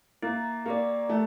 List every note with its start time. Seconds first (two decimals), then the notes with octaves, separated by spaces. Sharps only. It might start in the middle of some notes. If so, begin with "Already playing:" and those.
0.22 A#3 E4
0.66 A#3 G4 A#4 D5
1.09 A3 E4